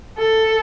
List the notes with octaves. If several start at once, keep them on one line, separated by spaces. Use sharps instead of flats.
A4